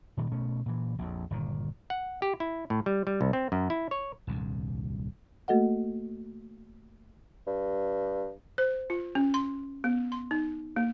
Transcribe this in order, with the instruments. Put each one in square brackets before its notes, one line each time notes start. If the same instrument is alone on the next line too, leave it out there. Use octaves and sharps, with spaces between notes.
[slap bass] A#2 D#3 G3
B2 A3 C#4
A#2 E3
A#1 F2
G1 A#2 D#3
[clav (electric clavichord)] F#5
G4
E4
A2
G3
G3
C2
C4
F#2
E4
C#5
[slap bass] D#1 C2 G2
[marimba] A3 A#3 F#4 A4 D#5 F#5
[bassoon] G2
[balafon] C5
F4
C#4
C6
B3
C6
D#4
A#3